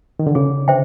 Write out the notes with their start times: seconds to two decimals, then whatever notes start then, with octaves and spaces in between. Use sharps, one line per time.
0.19 D#3
0.27 D3
0.35 C#3 G#4
0.68 D3 C5 E5 G5